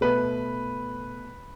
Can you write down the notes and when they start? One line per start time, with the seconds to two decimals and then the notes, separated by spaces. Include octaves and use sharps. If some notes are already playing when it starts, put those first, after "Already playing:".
0.01 B2 A3 B4